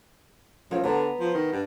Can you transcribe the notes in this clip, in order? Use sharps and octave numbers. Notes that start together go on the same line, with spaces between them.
F#2 F3 C#5
D3 B3 A#5
F3
D#3
G2